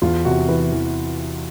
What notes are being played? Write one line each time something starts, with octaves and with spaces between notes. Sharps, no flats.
E2 F4
C3 F#4
E3 B4
E3